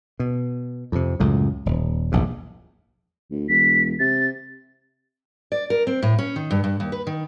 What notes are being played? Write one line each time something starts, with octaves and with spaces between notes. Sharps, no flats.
B2
F2 C3
C#2 F#2 A2
D#1
E1 A#1 G#2
D2
E1 B6
C3 A6
D5
A#4
C4
A2
C#4
D#3
G2
G2
D#2
B4
D#3